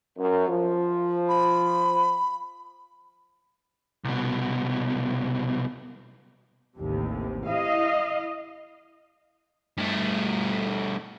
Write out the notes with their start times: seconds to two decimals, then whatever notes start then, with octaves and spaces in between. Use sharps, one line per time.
0.18 F#2
0.48 F3
1.28 B5
4.04 C2 B2
6.79 A1 D#2 C3
7.47 E4 D#5 F5
9.78 G2 A3